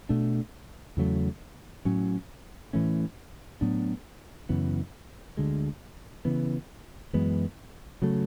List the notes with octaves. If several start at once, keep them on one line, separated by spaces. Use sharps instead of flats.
B2 A3 D4
E2 C#3 F#3 A3
A2 F#3 C#4
A2 E3 A3 C#4
A2 F#3 B3 D4
F#2 C#3 E3 B3
D2 D3 G#3
C#3 E3 B3
F#2 E3 G#3 B3
C#3 F#3 A3